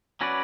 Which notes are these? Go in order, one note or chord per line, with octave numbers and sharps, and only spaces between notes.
F#3 C#4 F#4 B4 D5